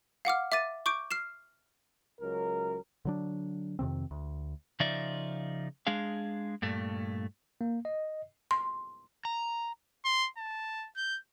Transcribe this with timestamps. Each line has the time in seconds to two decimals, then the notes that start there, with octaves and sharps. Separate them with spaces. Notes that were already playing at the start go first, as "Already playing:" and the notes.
0.25 F5 F#5 D6 F6
0.52 E5 D6 A6 D#7
0.86 C#6 D6 G6 D7
1.11 F6 C7 E7
2.20 C#2 F#3 A#4
3.05 D3 F#3 D4
3.79 F2 C3 D#3 C4
4.11 D2
4.80 C#3 F3 D#4 F4 D5 E5
5.87 G#3 D4 G#4 F5
6.62 G2 A#2 A3
7.61 A#3
7.85 D#5
8.51 C6
9.25 A#5
10.05 C6
10.38 A5
10.96 G6